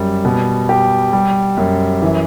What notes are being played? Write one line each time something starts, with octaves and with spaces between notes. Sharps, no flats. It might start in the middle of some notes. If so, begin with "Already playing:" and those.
Already playing: F#2 G3
B2
G4
G3
F#2
E3